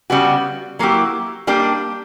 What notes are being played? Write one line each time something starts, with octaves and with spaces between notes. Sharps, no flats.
C#3 G3 B3 F#4
F#3 A#3 E4 G4
G3 A#3 D4 G4